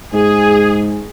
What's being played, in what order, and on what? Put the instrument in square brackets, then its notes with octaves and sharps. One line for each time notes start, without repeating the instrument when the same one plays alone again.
[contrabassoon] G#2 [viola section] G#4